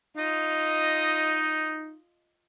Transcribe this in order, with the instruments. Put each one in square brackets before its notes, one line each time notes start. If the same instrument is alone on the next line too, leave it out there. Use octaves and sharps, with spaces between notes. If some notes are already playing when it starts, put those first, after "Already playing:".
[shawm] D#4 [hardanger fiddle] F4 D#5